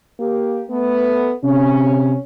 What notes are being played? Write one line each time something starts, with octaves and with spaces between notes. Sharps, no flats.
A#3 G4
A3 B3
C3 C#4